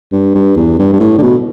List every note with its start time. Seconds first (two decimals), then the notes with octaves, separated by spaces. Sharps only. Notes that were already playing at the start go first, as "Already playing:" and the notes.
0.12 G2
0.35 G2
0.57 E2
0.79 G2
0.93 G2
1.00 A2
1.18 D3
1.22 B2